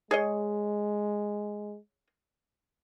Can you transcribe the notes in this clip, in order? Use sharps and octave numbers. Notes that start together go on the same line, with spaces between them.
G#3 G#4 C#5 D#5